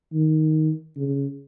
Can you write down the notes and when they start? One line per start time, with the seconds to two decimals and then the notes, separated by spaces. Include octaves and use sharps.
0.13 D#3
0.97 C#3